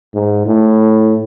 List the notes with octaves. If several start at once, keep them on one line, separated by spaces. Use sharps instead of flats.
G#2
A2